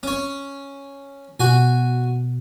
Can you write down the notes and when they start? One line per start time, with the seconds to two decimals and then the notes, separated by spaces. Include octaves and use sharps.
0.03 C#4 C#5
1.40 B2 F#4 G#5